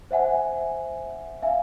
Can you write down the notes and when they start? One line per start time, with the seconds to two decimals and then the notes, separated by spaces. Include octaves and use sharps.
0.11 C5 E5 F#5 G#5
1.42 E5 F5 G#5